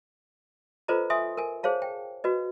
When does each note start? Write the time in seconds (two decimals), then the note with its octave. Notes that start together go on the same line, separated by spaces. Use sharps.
0.88 F4 A4 B4 C5 D#5 A#5
1.10 E5 G#5 C6 D#6
1.37 A#4 G#5
1.63 G#4 C5 C#5 F5 A5
1.82 G5
2.24 F#4 B4 D#5